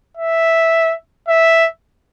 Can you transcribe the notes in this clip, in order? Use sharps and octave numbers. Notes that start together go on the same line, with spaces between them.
E5
E5